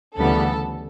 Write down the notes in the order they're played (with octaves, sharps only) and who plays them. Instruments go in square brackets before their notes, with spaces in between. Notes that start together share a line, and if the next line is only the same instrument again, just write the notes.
[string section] D2 C#3 E3 G3 B3 A4